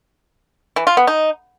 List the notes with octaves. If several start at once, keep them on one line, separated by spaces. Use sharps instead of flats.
E3
F4
B3
D#4